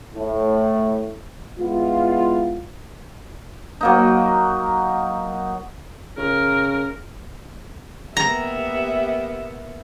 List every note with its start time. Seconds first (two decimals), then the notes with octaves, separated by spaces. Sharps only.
0.14 A2
1.59 G#3 B3 E4 F4
3.81 F#3 A#3 D#4
6.18 C#3 A#4
8.17 A#3 B3 G4 E5 A#5